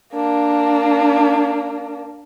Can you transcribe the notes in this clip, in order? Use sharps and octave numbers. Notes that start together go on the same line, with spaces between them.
A#3 D4